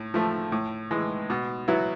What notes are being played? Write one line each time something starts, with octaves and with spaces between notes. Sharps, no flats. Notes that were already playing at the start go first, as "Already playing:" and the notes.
Already playing: A2
F3 A3
A2
E3 G#3
B2
F#3 B3 E4